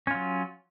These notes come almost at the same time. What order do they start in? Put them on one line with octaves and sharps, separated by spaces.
C#4 F4 F#3